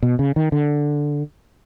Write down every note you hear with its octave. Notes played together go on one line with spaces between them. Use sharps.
B2
C#3
D#3
D3